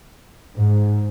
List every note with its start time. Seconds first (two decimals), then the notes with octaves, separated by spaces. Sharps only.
0.57 G#2